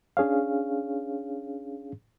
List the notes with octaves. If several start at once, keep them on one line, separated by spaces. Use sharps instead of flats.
C#4 D4 G#4 C#5 F5